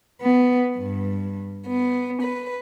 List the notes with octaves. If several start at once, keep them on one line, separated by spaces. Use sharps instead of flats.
B3
G2
B3
B4